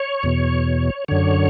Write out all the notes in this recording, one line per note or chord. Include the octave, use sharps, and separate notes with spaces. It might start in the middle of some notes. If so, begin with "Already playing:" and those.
Already playing: C#5
E2 B2
F#2 D3 C#5